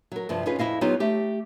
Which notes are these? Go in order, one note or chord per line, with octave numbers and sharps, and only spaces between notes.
F#3 A#4
G2 C3 F3
C#4 D#4 F4 G#4 B4
F2 E3 E4 D#5 F5
F#3 B3 D#4 F4 G4
A3 G4